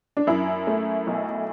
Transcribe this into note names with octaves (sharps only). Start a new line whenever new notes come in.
D4
F#2 E4
A3
B1